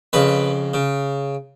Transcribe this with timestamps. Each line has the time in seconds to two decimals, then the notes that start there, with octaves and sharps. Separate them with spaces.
0.13 F2 C#3 B4
0.74 C#3